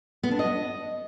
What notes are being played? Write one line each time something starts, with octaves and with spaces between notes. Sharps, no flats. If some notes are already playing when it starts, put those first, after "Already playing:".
B3
D4
D#5